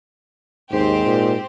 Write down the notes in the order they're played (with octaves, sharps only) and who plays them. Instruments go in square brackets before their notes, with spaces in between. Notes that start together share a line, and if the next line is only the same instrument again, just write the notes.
[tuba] D#2 [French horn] G#2 [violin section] C4 G4 C5
[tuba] A#2